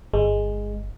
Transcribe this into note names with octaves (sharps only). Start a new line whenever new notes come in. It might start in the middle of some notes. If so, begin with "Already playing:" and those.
G1 G#3